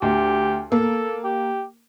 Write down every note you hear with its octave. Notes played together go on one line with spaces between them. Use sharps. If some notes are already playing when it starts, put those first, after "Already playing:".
D2 G4
A#3 A4
G4